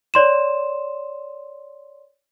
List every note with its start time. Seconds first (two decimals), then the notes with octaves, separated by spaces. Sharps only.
0.14 C#5 D5 C6 E7